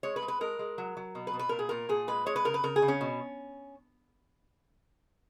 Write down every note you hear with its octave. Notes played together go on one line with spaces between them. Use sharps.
G#3 C#5
B4
G#3
B4
G#3 A#4
G#3
F#3
F#3
B2
B4
B2
B4
A#2 A#4
G#4
A#2 A#4
A#2 G#4
G#3 B4
G#3 C#5
B4
C#3 A#4
B4
C#3 A#4
G#4
C#3
C#4
B2